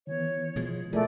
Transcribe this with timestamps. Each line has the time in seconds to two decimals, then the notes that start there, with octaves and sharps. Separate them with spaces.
0.07 D#3 E3 B3 C#5
0.56 B2 F3 G#3
0.93 B2 F3 A3 E4 G#4 A#4 D5